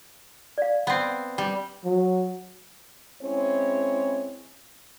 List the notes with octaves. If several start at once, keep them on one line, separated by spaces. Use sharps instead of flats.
D5 F5
B3 C4
G3
F#3
G#3 C4 C#4 E4 G#4 C#5